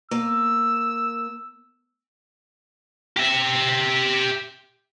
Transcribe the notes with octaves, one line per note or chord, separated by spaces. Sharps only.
A#3 E6
G4 E5